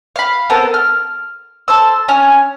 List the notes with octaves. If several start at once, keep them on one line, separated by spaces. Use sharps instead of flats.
F5 B5
B3 C4 A4 A#4
F6
A4 C5 E6
C#4 G#5 F6